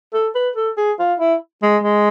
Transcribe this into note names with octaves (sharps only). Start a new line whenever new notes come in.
A4
B4
A4
G#4
F4
E4
G#3
G#3